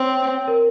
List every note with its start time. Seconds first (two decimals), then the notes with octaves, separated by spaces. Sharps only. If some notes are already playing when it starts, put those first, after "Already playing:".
Already playing: C4 C5 C#5
0.48 A#4